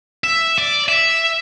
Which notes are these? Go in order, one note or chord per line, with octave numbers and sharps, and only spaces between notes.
E5
D5
E5